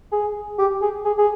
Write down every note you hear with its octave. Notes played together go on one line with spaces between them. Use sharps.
G#4
G4
G#4
G#4
G#4